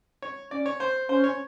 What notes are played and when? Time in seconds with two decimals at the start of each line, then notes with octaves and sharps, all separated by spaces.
0.22 C#5
0.51 C#4 D5
0.66 C#5
0.80 C5
1.09 C#4 C5
1.24 C#5